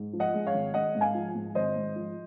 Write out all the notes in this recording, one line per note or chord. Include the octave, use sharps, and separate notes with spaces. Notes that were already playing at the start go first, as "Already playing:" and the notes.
Already playing: G#2
F3
D#5 F#5
G#3
C#5 F5
G#1
G#3 D#5 F#5
G#2
F5 G#5
F3
G#2
G#1 C5 D#5
G#2
F3